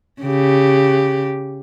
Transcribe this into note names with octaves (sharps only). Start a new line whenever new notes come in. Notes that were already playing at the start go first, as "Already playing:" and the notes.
C#3 G4